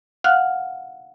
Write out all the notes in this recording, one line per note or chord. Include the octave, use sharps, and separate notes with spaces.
F5 F#5 F6 F#6